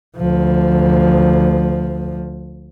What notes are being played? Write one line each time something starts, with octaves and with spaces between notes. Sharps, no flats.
D2 F3